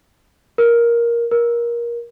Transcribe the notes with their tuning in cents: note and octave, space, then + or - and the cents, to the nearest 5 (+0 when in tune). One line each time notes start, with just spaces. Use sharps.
A#4 +10
A#4 +20